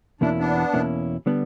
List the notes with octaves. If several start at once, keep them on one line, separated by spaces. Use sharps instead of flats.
E2 B2 A#3 C#4 D4 E4
B3 D4
E2 B2 A#3 C#4 E4
D3 G3 B3 D4